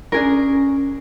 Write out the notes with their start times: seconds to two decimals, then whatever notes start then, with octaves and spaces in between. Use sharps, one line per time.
0.12 C#4 D4 G#4 A#4